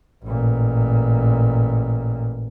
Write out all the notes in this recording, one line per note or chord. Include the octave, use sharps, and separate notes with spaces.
A1 A#2